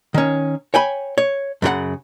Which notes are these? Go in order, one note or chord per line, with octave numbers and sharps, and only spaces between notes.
D#3 C#4
C#5 G5 G#5 B5
C#5
F#2 C#3 G4 F#5